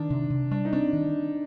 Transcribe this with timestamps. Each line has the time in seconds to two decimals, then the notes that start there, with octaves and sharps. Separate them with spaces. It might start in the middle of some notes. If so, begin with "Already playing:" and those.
Already playing: D#3 D4
0.10 C3
0.30 C3
0.51 G3 D4
0.65 D#4
0.73 C4 D4
0.93 D#3